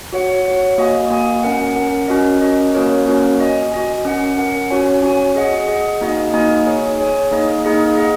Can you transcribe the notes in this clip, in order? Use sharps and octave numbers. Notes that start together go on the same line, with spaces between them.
F#4 C#5 F#5
F#4 C#5 F#5
A#3 F#4 D#5 G#5
A#3 F#4 D#5 G#5
C#4 A#4 F#5
C#4 A#4 F#5
C#4 F#4 A#4 D#5
C#4 F#4 A#4 D#5
A#3 C#4 F#4 A#4 C#5
A#3 C#4 F#4 A#4 C#5
F#4 D#5 G#5
F#4 D#5 G#5
C#4 A#4 F#5
C#4 A#4 F#5
C#4 F#4 C#5 G#5
C#4 F#4 C#5 G#5
G#4 D#5 F#5
G#4 D#5 F#5
A#3 D#4 F#4 D#5 G#5
A#3 D#4 F#4 D#5 G#5
G#4 C#5 G#5
G#4 C#5 G#5
A#3 D#4 G#4 D#5
A#3 D#4 G#4 D#5
G#4 D#5 F#5